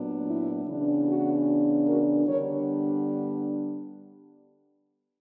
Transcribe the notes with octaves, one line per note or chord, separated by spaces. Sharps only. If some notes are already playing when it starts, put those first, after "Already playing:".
Already playing: A#2 F#3 B3 D4
E4
C#3 E3 B3 D4
F#4
F#4 A#4
D3 G3 B3 D4 A#4 C#5